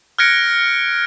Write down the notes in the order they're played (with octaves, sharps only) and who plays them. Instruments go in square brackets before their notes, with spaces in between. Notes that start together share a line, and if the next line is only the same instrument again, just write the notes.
[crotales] F6 F#6 G#6 A#6 C#7 D7